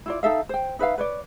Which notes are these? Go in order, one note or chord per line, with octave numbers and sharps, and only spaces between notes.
E4 F4 D5
D#4 A4 E5 F5
C5 G5
D#4 B4 E5 F5
B4 C#5 D5